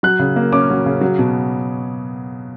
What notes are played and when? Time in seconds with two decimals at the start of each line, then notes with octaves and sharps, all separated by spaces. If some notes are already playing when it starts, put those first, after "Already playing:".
0.03 F#3 F#6
0.19 C#3
0.36 A#3
0.52 C#4 D6
0.70 F#3
0.86 C#3
1.01 F#3
1.19 B2